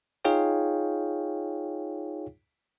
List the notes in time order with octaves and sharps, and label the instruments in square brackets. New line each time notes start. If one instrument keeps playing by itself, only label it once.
[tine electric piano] D#4 F4 G#4 C#5 F5 G5